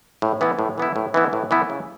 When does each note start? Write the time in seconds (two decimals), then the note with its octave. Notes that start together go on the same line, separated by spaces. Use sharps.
0.22 A2
0.41 E3 B3 E4
0.59 A2
0.78 E3 B3 E4
0.96 A2
1.14 E3 B3 E4
1.33 A2
1.51 E3 B3 E4
1.70 C#3